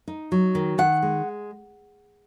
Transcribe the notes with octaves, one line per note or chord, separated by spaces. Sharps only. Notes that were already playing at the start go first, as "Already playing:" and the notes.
D#4
F#3
D#3
D#3 F#5
G#3